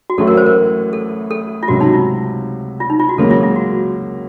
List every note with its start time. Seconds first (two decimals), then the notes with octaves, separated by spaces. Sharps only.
0.10 F#4
0.18 A1 A2 F#3 A3 A4
0.28 A#4
0.37 C5
0.46 A#4
0.93 A4
1.31 A4
1.63 F4
1.68 C#2 C3 F#3 F#4
1.81 D#4
1.93 F4
2.80 F4
2.90 D#4
2.99 F4
3.09 F#4
3.18 C#2 C#3 F#3 A#3 A4
3.31 F4
3.43 F4
3.56 F#4